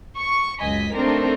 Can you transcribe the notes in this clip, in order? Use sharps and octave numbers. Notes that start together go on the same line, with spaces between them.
C#6
C#2 F#2 D#5 G#5 B6
A3 C4 D4 D#4 A#4